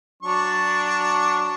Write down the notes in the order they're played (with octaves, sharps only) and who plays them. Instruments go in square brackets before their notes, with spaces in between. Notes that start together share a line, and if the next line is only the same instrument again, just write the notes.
[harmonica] F#3 D4 C#6